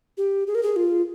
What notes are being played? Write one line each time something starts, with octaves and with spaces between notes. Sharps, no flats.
G4
G#4
A#4
G#4
F4